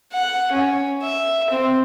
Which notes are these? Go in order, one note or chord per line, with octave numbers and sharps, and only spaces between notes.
F#5
C#4
E5
C4